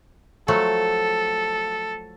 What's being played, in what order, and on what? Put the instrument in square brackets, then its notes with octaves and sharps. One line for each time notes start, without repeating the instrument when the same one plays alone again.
[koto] F3 F#3 A3 [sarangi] A4